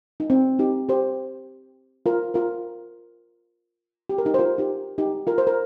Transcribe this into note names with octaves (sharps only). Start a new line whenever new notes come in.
D#4
C4
D#4 G4
G4 C5
F4 A#4
F4 A#4
G4
A#4
D#4 G4
C5
F4 A#4
D#4 G4
D#4 G4
F4 A#4
C5
A#4